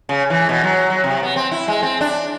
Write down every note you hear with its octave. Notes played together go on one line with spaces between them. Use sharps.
C#3
E3
B2
F#3
F#3
C3
B3
C4
E4
G#3
C4
D4